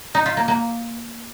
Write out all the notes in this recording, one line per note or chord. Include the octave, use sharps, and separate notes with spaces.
D#4
F4
A#3
A#3